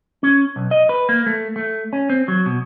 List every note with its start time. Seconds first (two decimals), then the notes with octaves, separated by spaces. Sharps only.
0.23 C#4
0.56 B1
0.71 D#5
0.89 B4
1.09 A#3
1.26 A3
1.56 A3
1.93 C#4
2.10 C4
2.28 F#3
2.46 B2